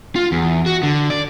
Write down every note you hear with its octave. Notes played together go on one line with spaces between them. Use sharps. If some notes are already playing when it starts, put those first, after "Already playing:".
F4
E2
F#4
D3
D5